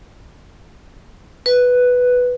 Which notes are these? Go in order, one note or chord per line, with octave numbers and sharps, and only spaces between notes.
B4